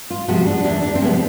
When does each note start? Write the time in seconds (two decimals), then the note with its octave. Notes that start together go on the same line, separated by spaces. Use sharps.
0.10 F4
0.28 C3 F3 G#3 B3 F#4
0.46 D4
0.64 E2 D4
0.83 D4
0.95 C4
1.01 C3 F3 G#3 B3 C#4